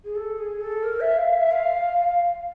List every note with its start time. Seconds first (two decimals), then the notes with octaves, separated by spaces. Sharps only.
0.05 G#4
0.16 A4
0.38 G#4
0.61 A4
0.83 A#4
1.00 E5
1.17 F5
1.35 E5
1.51 F5